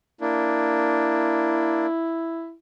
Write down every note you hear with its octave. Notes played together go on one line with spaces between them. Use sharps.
A#3 D4 E4